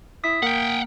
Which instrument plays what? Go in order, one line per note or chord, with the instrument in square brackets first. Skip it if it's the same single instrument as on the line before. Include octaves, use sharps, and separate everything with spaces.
[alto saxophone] E4 [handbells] D#6 B6
[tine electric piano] A#3 [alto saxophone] A#4 [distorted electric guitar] F#5 G5